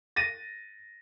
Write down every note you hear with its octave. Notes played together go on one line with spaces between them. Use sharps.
A6 A#6 D#7